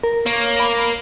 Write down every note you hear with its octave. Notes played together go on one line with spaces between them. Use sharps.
A#4
A#3 C#5
B5